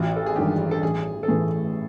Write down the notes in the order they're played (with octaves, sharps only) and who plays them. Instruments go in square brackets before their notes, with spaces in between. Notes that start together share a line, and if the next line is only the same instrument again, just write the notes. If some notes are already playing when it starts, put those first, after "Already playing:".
Already playing: [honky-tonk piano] A1 [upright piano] F4 F#4
[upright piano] A4
G#4
[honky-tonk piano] G2 D#3 G#3 [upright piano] G4
[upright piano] A4
[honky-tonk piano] A1 [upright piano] G#4
[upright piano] A4
[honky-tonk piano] A2 E3 [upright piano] G#4